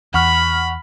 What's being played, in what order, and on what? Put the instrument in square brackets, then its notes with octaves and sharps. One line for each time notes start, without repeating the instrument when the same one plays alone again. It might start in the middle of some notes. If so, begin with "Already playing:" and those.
[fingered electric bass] E2 [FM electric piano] F#5 C#6 F6 [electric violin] B5